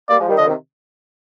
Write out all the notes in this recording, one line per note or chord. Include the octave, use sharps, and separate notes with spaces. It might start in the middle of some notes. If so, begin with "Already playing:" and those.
G3 A#3 D5
F3 G#3
D#3 G3
D3 F3 D#5
C3 D#3